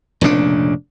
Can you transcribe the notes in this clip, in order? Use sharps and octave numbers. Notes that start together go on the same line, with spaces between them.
F1 A#2 C#3 D4